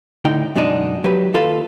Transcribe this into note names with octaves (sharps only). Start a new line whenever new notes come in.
A2 D3 D#4 G5
F#2 B2 G#3 D4 D#4
F#3 G4 B4
D#2 F4 A4 B4 F5